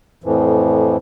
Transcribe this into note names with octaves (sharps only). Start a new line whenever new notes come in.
F2 A2 E3 F3